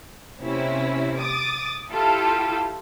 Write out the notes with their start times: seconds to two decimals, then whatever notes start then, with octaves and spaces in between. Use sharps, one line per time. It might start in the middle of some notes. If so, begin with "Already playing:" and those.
0.40 C3 A#3 C4 C#4 E4
1.17 D6 D#6 A6
1.90 E4 F4 G4 A4